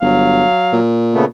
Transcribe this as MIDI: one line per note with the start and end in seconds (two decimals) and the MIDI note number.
0.01 0.44 31
0.01 0.80 54
0.01 0.82 77
0.73 1.25 46
1.14 1.25 49
1.14 1.25 57
1.14 1.25 59